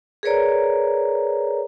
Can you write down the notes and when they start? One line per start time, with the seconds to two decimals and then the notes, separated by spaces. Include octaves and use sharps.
0.23 G#4 A#4 B4 C#5 D5 A#5